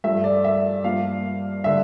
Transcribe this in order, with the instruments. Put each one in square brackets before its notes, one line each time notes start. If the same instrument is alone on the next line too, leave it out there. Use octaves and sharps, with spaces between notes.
[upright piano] G2 F3 A3 E5
D5
E5
G2 F3 A#3 F5
D3 G3 E5